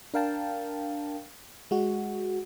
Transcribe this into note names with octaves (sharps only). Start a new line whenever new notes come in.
D4 A#4 F5 G5 A5
G#3 F#4